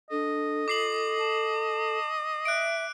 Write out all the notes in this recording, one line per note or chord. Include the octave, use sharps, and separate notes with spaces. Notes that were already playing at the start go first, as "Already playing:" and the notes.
D4 A4 D#5
F4 D6 C7 F#7
A5
E5 F#6 D7